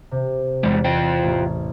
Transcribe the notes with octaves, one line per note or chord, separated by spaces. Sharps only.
C3
E2 E3 G3 G#3
F4 C5 G5
A1